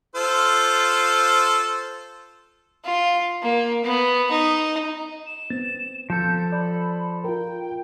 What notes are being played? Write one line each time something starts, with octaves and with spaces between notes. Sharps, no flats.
F4 A4 C5
F4
A#3
B3
D#4
E7
B3 C4 A6
F3 A4 G6
D5 B5
F4 A#4 G5